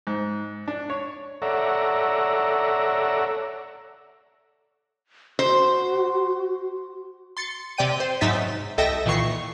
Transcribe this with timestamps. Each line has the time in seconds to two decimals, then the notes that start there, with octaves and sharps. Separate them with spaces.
0.07 G#2
0.68 D4
0.90 C#5
1.42 A4 C#5 D5 E5 F#5 A#5
5.39 F#4 C5
7.37 C6 A6 C#7
7.78 C3 D5 G5 D#7
8.00 C5
8.21 G#2 F#3 D#4 E5 A6 B6
8.78 C2 A4 D#5 E5 G5 A#6
9.06 A#2 D#3 E3 C#6 C7